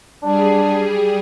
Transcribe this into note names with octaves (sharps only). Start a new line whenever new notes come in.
G3 D4 G#4